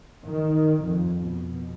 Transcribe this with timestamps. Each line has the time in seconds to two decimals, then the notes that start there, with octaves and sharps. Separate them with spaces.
0.25 D#3
0.84 F2
1.21 B2